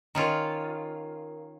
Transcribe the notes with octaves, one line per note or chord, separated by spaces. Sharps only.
D#3 C#4 F4 A#4 A#5